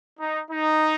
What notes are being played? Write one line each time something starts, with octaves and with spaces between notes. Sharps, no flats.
D#4
D#4